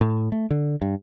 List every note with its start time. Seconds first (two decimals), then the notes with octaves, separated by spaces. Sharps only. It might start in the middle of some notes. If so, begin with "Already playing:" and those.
0.01 A2
0.32 A3
0.50 D3
0.82 G2